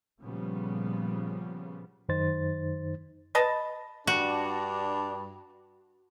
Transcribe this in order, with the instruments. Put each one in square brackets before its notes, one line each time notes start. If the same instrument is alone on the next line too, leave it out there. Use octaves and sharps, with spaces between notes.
[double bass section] A#2 C#3 F3 G3 B3
[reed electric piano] F#2 D#3 D#4 C5 A6
[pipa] B4 D#5 A5
[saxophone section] G2 D4 [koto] F#4